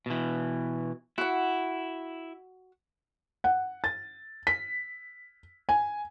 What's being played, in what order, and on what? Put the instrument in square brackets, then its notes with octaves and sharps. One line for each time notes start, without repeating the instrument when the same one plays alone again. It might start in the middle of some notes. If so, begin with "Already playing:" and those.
[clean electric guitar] B2 E3
[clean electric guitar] E4 [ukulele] F#4 F#5
[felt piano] F#5
A6
B6
G#5